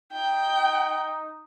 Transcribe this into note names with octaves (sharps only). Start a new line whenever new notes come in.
D#4 G5